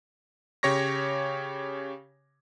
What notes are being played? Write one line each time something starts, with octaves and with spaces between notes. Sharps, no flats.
C#3 G4 C#5 C#6 A#6